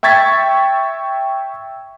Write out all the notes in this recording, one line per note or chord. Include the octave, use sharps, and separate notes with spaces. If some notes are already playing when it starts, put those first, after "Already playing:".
E5 G5 C#6 G#6 A6 B6